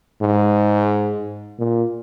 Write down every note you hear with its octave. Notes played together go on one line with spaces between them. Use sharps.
G#2
A#2